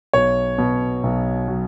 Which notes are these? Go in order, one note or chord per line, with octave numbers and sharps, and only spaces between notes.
B1 C#5
B2
B1
F#3